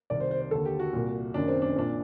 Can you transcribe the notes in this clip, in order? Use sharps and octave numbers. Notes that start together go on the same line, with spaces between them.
C2 C3 D#3 D5
C5
C5
C5
D#2 D3 A4
G4
F#4
C2 A#2
F#1 F#2 D#3 D4
C4
D4
C4
A#1 A#2 D4